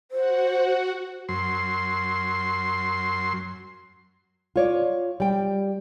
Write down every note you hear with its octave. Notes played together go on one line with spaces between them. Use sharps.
F#4 C5 F#5
F#2 C6
F4 C#5 D5
G3 G5